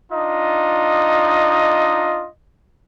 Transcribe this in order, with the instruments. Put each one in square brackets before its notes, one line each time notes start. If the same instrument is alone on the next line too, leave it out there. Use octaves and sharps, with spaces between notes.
[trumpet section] D4 D#4 F4 D#5